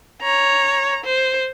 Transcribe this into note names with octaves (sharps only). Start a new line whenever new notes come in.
C#5 A#5
C5